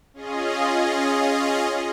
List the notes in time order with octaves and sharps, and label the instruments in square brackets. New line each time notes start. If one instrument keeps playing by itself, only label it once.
[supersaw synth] C#4 F4 G#4 D#5